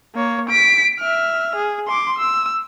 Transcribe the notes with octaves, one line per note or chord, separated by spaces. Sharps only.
A#3 C#5
B6 D7
E5 F6
G#4
C6 D6
E6